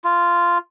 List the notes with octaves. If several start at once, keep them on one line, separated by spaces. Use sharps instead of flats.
F4